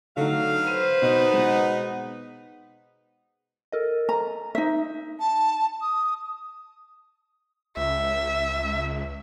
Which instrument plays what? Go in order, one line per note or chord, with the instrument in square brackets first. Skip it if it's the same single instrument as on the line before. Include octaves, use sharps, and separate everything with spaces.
[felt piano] D3 A3 D#4 [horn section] F#3 F5
[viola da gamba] B4 C5 [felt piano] D#7
[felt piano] B2 [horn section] B3 D#4
[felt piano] B2 G#3
[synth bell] A4 A#4 D#5
[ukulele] A#5
D#4 E5
[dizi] A5
D#6
[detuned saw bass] C#2 [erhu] E5